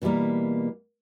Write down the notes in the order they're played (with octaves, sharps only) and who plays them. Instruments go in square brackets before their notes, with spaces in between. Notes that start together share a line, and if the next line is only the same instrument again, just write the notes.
[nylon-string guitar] B2 E3 F3 G3 A#3